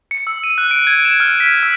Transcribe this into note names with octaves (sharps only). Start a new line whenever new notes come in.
C#7
E6
D#7
F#6
D7
G#6
E7
F6
B6
E6